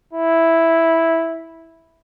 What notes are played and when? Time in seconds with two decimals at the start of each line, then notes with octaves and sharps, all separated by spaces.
0.13 E4